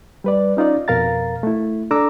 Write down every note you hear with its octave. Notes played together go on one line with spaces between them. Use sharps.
G3 B4 D5
C#4 D#4 F4 D5
F2 B2 A#4 F5 A#5 A6
A3 E4
D4 A4 A#5 D6 E6